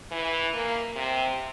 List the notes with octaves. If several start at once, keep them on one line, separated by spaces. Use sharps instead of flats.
E3
A#3
C3